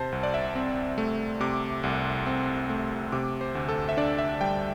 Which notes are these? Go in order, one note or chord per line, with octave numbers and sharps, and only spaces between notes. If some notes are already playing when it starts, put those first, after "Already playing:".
Already playing: C3 C5 A5
C2
D5
E5
C4
A3
C3 D6
C2
C4
A3
C3 D6
C5
D2
A4
E5
D4 D5
E5
G3 G5